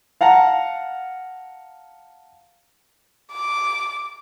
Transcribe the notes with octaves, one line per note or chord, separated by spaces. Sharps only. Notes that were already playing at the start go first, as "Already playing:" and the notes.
F5 F#5 A5 A#5
D6